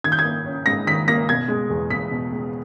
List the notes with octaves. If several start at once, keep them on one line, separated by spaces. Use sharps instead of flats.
D#3 G#6
G6
G#6
A#3
C#4
G#2 A#6
D#3 B6
A#3 A#6
B2 G#6
G#3
E2
E2 B6
B2
G#3